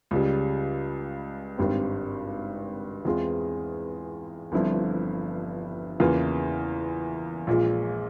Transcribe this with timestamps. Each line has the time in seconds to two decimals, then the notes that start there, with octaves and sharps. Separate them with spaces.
0.11 C#2 C#3 G3
1.58 G#1 G2 G3 C4
3.05 E2 E3 G#3 C4 F4
4.52 G1 G2 F3 C4 E4
6.00 E2 C#3 E3 A#3 F4
7.47 A#1 A#2 G#3